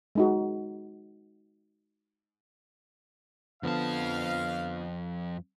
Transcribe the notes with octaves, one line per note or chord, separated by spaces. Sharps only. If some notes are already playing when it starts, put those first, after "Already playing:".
G#3 D#4 F#4
F2 D3 F3 B3 F5 A5